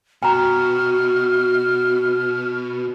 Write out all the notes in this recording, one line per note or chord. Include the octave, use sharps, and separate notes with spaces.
B2 F#4 G5 A#5 F6